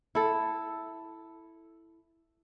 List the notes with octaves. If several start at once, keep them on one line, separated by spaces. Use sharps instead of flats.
E4 A4